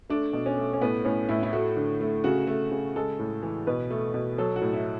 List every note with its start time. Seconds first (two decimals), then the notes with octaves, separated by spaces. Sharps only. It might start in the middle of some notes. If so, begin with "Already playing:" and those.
0.09 A3 D4
0.33 B2
0.46 C#4
0.58 A3
0.73 C#4
0.81 A2 B3
1.05 A2 C#4
1.29 A2 E4
1.43 E4
1.53 A3 F#4
1.77 D3
2.01 A3
2.24 C#3 F#4
2.47 A3
2.72 C#3
2.96 G#3 A4
3.19 A2
3.42 E3
3.67 B2 B4
3.91 A3
4.14 B2
4.38 F#3 A4
4.56 F#4
4.61 A2
4.73 E4